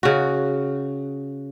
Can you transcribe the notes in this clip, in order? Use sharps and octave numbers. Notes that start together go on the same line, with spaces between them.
C#3 F#4